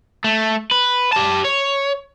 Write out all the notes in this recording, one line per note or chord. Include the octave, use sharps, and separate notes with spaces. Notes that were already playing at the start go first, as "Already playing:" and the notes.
A3
B4
G4 A5
C#5